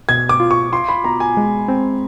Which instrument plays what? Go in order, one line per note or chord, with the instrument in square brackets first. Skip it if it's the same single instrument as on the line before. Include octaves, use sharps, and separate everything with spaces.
[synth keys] B2 [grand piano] G#6
[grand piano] D6
[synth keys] F4
[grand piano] C#6
[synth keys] F4 [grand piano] C6
[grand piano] B5
[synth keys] B2 [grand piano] A#5
[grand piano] G#5
[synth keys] G#3
C4